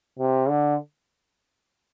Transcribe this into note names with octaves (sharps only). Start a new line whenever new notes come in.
C3
D3